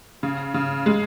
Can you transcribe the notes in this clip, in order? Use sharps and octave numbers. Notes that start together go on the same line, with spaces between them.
C#3
C#3
G#3